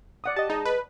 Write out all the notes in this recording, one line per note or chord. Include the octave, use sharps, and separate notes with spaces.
D5 F#5 D#6
G4 D#5 A5
G#3 D#4
B4